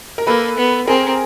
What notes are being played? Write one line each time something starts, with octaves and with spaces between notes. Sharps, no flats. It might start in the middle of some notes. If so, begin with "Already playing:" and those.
A#4
A#3 A4 B4
B3
C4 G#4 A#4